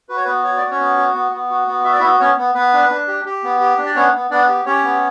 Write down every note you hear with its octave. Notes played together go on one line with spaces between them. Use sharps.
F#4 B4
C#5
B3 B4
F#4 C#5
F#4 D5
C#4 C#5
B3
F#4
B3
B3
F#4
B3
F#4 E5
D5
B3 E4 E5
B3 C#4 C#5
B3
B3 B4
D4
D4
G4
G4
B3
G4
D4
D5
B3 C#4 C#5
B3
B3 D4 D5
G4
C#4 G4 C#5
B3